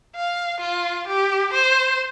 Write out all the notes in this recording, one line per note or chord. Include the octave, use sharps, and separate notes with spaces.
F5
F4
G4
C5